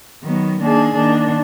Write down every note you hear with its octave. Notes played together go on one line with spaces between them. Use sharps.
D#3 F#3 B3
D#3 A#3 D4 G#4
D#3 A#3 D4